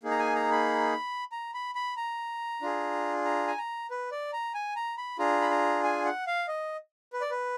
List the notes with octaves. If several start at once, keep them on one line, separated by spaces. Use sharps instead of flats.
A#3 D#4 G#4
A#5
G#5
A#5
B5
A#5
B5
B5
A#5
D4 F4 G#4
A#5
G#5
A#5
B4
D5
A#5
G#5
A#5
B5
D4 F4 G#4 A#5
B5
A#5
G#5
F#5
F5
D#5
B4
D5
B4